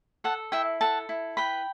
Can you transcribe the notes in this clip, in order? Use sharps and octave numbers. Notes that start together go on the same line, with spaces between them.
A4 F#5 A5
E4 E5 G5
A4 F#5 A5
E4
B4 G5 B5